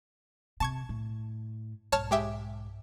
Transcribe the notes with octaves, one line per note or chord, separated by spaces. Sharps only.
C3 A5 C#6 G#6
A2
B1 G#2 C#5 A5 F6
G#3 G4 E5